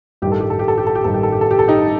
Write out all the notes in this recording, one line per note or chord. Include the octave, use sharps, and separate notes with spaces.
A1 G2 D#3 G4
A4
G4
A4
G4
A4
G4
A4
G4
A1 G2 D#3 A4
G4
A4
G4
A4
G4
A4
D#4 G4